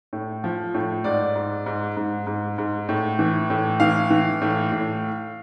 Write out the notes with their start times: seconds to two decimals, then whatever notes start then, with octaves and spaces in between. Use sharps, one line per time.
0.13 A2
0.44 F3
0.74 A2
1.04 G#2 D5
1.36 G#2
1.66 G#2
1.97 G#2
2.27 G#2
2.58 G#2
2.89 A2
3.19 E3
3.50 A2
3.80 E3 F5
4.10 E3
4.42 A2
4.72 A2